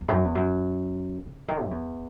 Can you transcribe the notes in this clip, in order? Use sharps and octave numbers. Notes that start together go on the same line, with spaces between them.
E2
G#2
F#2
E2
F#2
C#3
D#3
F#2
E2